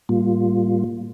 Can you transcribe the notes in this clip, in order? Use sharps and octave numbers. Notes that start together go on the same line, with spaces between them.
A2 G3 A#3 F4